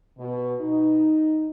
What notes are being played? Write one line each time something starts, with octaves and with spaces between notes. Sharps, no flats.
B2
D#4